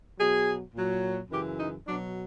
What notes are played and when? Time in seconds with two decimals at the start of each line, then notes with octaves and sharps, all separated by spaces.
0.19 B2 F#3 G#4
0.74 A#2 F#3
1.31 F#2 C#3 E3 G4
1.59 D#4
1.87 B2 F#3 D4